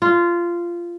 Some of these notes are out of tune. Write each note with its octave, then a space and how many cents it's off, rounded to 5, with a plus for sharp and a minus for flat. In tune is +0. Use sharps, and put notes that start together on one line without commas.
F4 -15